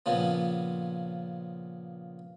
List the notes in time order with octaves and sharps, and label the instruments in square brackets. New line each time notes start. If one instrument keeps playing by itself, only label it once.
[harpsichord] A#2 C#3 F3 B3